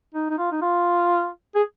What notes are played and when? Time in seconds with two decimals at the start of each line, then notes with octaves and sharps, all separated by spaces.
0.15 D#4
0.30 D#4
0.38 F4
0.52 D#4
0.62 F4
1.55 G#4